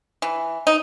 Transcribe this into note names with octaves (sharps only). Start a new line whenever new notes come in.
E3
D#4